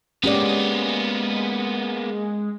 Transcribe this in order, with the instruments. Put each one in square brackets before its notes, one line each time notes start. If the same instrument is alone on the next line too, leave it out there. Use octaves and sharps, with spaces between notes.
[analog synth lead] G#3 [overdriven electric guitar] A#3 B3 [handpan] C#4 G4 D5